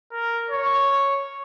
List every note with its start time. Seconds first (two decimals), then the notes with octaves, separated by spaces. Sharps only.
0.12 A#4
0.51 C#5